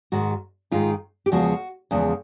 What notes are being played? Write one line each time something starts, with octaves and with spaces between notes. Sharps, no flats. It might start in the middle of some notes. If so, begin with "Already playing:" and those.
G#2 D#3 G#3 F#4
G#2 D#3 G#3 F4
G4
E2 C#3 F3 G#3 B3 F#4
E2 C#3 F3 G#3 B3